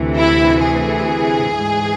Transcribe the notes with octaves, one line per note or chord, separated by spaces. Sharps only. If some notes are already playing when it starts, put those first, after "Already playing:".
Already playing: D2 C3 E3
E4
G#4
G#2 E3